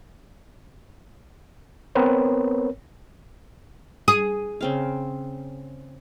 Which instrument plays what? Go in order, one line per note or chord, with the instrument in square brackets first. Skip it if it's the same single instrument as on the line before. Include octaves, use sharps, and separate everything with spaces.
[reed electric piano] B3 C4 A#4 B4 C#5
[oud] G#4 [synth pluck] D#6 D#7
[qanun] C#3 C4 F5